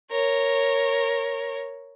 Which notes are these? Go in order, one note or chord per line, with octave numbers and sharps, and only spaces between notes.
A#4 C#5